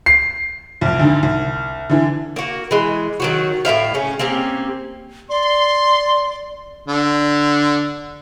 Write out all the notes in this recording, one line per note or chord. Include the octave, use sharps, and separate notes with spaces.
C7
C2 F2
D2 G#2 D3 D#3
C2
D3 E3
A#3 F#4
E3 G#3
D#3 F#3 F#4
A2 C4 E5 F5
C#3 C#4
A#3 C4 C#4 G4
D5 C6
D3